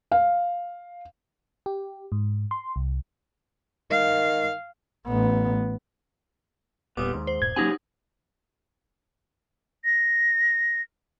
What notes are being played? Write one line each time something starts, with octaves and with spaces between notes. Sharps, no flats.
F5
G4
G#2
C6
C2
D#3 F5
A1 B3
E1 A#2 G3 B3 D6 D#6
D#2 G#2
C5
D#1 G2 A#2 G#6
C#2 F#3 A#3 C#4 D#4 G4 F#5 G#5
A#6